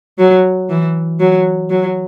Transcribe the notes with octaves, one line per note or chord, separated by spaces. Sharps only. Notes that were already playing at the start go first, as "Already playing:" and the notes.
F#3
E3
F#3
F#3